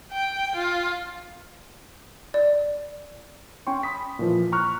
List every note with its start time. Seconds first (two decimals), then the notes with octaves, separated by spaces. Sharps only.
0.12 G5
0.56 F4
2.34 D5
3.67 C#4 G5 C6 C#6
3.83 B5 D#6 B6
4.19 A#2 E3 F3
4.52 A#5 C#6 F6 F#6